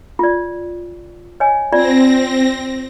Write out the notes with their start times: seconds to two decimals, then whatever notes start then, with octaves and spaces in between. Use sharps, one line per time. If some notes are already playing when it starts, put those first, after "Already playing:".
0.19 F4 D5
1.40 C#5 D#5 G#5
1.72 C4 F4 D5 A#6